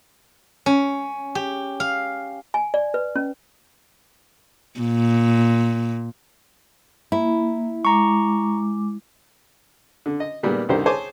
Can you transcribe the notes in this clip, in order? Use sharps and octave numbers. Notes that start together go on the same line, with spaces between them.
C#4
G4
F5
G#5
D5
B4
C#4
A#2
A#3 E4
G#3 A#5 C#6 D6
D3
D#5
A#2 D#3 G3 G#3 A#3 B3
C2 D3 D#3 G4 C5 A#5
G#4 C5 C#5 G#5 A5 D6